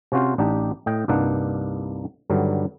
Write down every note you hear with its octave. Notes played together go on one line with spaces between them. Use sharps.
C3 C#4 F4 F#4 C5
A1 D4 D#4 G4
A2 D#5 G5
C2 G2 A#3 D4 D#4 F#5
G2 D3 D#3 F#3 G3